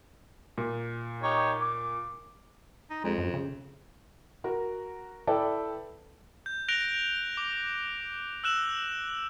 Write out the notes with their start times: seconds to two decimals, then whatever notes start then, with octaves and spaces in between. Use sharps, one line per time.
0.58 A#2
1.23 D#4 G4 C#5
1.61 D6
2.90 D#4
3.04 F2 G#3
3.18 F#2
3.34 C#3
4.44 F#4 A#4
5.27 E4 A4 B4 D5 E5 G5
6.46 G6
6.68 F#6 A#6 D7 F7 G7
7.37 D6
8.44 E6 F#6 E7 F#7